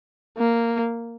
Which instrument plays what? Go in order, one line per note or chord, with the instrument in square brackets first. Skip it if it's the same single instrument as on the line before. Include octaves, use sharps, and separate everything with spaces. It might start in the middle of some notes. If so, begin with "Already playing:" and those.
[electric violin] A#3